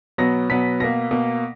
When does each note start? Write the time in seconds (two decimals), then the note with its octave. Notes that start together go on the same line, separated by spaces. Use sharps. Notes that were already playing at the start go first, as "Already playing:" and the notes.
0.18 B2 F#3 B3 A#6
0.49 B2 F#3 B3 B6
0.80 B2 A#3 A#6
1.11 B2 A#3